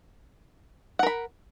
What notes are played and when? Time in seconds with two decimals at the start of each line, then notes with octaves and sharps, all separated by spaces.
0.99 F#5
1.03 A#4
1.06 B5